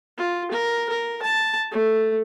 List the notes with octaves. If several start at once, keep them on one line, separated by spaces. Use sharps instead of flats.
F4
A#4
A#4
A5
A3